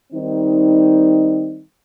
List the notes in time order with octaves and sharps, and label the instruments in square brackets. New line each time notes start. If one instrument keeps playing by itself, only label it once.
[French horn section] D#3 G3 C4 D#4